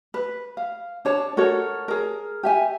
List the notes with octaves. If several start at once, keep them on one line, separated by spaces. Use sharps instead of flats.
B4
F5
D4 C#5 A5
F#4 A4 A#4 C#5
G#4 A#4
G4 E5 G#5